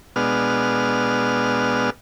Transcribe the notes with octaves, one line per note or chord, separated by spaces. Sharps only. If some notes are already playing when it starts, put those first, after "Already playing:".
B2 G#3 B3 D4 F6